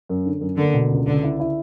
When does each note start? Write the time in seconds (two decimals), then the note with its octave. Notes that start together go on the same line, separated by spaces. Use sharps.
0.09 F#2
0.26 D3
0.41 F#2
0.58 D3 A#3
0.74 B2
0.91 C#2
1.06 C#2 D3
1.23 E4
1.40 E4